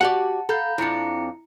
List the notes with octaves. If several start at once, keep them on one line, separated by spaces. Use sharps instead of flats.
F#4 G4 D5 F#5 A5
A4 F5 A#5 B5 G6
F2 D4 E4 A#5 C#7